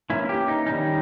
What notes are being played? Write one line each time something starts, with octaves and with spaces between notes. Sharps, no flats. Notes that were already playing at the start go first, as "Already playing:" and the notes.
E3 A#3 C#4 E4
G4
D#4
D#3 G3 C#4 D#4